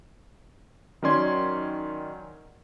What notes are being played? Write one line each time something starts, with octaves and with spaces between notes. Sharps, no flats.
D#3 F#3 C#4 D5 C6 G#6